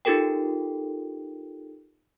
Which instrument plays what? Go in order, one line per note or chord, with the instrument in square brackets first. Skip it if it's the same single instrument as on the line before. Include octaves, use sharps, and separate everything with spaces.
[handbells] D#4 F4 G4 A4 A#4 G5